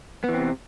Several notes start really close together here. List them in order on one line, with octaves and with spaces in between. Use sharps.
B3 E3 C4 C3